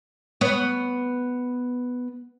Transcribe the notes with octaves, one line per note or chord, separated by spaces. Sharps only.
B3 C#5